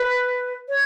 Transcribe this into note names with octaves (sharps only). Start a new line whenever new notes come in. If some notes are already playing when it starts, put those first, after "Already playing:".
Already playing: B4
C#5